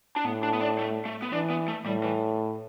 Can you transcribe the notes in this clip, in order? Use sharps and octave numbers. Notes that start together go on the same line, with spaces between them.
D4
A2 B3
D4
B3
D4
A3
A3
B3
E3 D4
B3
A3
A2 G3
E3